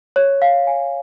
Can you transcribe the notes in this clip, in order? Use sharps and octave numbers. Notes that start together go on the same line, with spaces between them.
C#5
F5
G#5